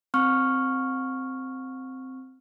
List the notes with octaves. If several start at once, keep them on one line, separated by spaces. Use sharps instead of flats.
C4 C#6 F6